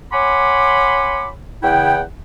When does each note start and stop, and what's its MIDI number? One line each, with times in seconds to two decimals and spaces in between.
0.13 1.29 73
0.13 1.29 78
0.13 1.29 80
0.13 1.29 83
0.13 1.29 84
0.13 1.29 86
1.63 2.00 40
1.63 2.00 49
1.63 2.00 64
1.63 2.00 78
1.63 2.00 79